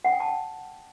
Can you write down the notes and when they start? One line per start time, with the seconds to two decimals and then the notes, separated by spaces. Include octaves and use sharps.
0.05 F#5
0.12 G5
0.20 A5
0.28 G5